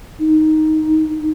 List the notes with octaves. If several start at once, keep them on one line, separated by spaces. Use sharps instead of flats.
D#4